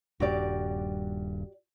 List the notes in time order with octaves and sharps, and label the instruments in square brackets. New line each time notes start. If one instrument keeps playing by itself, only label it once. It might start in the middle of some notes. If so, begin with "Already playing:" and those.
[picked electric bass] D#1 G2 [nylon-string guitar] F#4 G4 D5